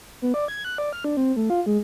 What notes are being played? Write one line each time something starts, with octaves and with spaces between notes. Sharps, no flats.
B3
D5
G#6
F#6
D5
F6
D4
C4
A3
F4
G#3